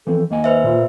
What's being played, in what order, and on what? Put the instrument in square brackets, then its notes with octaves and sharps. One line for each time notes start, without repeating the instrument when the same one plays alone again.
[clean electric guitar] E3 F3 C4 [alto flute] A4
[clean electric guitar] D#2 A#3 G#5 [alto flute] D#5
[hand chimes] B4 C5 E5
[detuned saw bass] A#2 [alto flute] F4